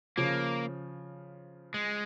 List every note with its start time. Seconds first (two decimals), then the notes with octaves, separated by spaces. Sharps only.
0.17 C#3 F3 A#3
1.74 G#3